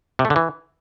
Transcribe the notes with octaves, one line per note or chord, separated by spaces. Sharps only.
C3
A3
D3
E3